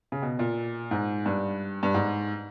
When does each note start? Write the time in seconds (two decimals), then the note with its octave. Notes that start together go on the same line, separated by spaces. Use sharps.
0.12 C#3
0.22 B2
0.39 A#2
0.91 G#2
1.26 G2
1.83 G2
1.94 G#2